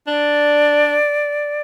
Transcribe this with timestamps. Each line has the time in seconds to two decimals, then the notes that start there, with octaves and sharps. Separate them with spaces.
0.07 D4 D5